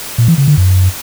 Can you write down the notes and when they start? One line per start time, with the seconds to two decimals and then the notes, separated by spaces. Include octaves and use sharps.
0.18 A#2
0.28 E3
0.38 C#3
0.48 D3
0.57 F#2